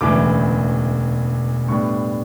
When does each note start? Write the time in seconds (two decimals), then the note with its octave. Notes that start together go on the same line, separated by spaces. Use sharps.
0.01 E1 D2 C#3 E3 D6
1.68 A2 G3 B3 D4 C#6